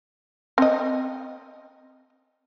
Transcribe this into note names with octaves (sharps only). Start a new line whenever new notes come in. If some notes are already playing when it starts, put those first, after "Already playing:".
C4 D#5